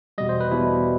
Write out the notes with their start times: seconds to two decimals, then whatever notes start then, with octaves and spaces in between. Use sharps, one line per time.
0.18 E2 B2 G3 D#5
0.29 C5
0.41 B4
0.51 E2 B2 G3 E4